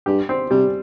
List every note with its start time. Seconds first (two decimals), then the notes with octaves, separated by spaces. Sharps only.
0.06 G2 G4
0.29 C4
0.51 C3 G3